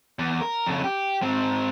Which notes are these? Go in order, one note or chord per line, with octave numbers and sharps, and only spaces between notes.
E2
A#4
F2 C#3
G4
G#2 C4